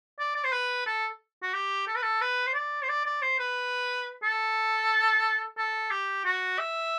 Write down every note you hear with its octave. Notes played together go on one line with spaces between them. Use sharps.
D5
D5
C5
B4
A4
F#4
G4
A4
B4
A4
B4
C5
D5
C5
D5
D5
C5
B4
A4
A4
G4
F#4
E5